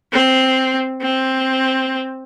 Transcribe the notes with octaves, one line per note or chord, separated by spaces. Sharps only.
C4
C4